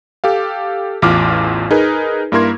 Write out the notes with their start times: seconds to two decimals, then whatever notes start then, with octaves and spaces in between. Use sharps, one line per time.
0.24 G4 A4 F5
1.02 A1 E2 F4 D6 F6
1.71 D#4 G#4 A#4 B4
2.32 G2 A#3 E4 A#4 C6 G#6